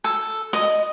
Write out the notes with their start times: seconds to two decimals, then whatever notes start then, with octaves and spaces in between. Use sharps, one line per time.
0.04 A4
0.53 D#5